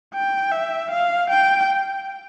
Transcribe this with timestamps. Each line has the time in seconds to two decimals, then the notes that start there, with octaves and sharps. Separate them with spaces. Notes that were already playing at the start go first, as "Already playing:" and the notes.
0.14 G5
0.52 E5
0.91 F5
1.30 G5